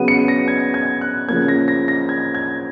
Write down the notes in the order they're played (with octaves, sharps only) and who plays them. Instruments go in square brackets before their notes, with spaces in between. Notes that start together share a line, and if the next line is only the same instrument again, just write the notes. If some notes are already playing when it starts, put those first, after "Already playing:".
Already playing: [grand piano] C#3 F#3 B3 D#7
C#7
A#6
G#6
G#6
F#6
C#3 F3 A#3 G#6
A#6
A#6
A#6
G#6
G#6